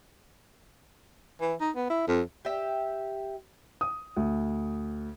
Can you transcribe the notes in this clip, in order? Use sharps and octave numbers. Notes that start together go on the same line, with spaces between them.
E3
D#4
B3
E4
F2
G4 E5
D#6
D2